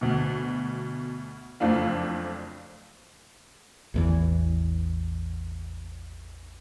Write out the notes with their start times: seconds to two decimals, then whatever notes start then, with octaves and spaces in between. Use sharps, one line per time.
0.01 D2 B2
1.60 F#1 F2 F3 A3 D4 F5
3.94 A1 E2 E3